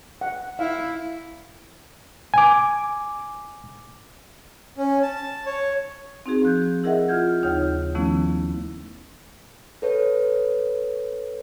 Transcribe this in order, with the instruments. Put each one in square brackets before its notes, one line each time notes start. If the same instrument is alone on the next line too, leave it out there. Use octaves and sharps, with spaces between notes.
[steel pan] F#5
[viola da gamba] E4 [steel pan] F5
[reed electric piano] G#5 D6
[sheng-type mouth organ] C#4
A5
C#5
[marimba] C4 D#4 F#4 G#4
F3 F#6 G6
E4 G#4 A#4 D#5 E5 F#5
F4 F6 G6 G#6
D#2 C#3 D#4 C#5 F6 G6
D#3 F3 A3 B3 C#4 E4
[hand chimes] A4 B4 C#5